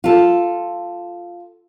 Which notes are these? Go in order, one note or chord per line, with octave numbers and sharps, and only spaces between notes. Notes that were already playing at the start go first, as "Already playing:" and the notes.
F4 A4